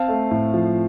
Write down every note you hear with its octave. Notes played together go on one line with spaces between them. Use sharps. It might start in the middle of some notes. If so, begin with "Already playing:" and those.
Already playing: C4 F5 A5
A3
A2
F3